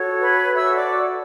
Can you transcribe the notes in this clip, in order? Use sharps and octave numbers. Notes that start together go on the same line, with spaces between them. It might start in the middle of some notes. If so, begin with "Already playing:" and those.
Already playing: F#4 A4 C#5
B4 B5
F#4 A4 C#5 E5 E6
D5 D6